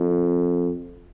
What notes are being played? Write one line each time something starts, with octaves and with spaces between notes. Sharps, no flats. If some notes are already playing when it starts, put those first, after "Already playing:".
Already playing: F2 F4